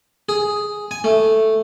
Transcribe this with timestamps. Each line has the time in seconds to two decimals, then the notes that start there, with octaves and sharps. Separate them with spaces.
0.29 G#4
0.91 G#5
1.04 A3